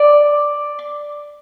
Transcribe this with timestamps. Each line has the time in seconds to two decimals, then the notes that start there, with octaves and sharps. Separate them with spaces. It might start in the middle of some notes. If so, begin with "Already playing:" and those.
Already playing: D5